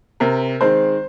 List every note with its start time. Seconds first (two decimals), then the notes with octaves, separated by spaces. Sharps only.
0.20 C3 A#4
0.61 D#3 G#3 C4 C5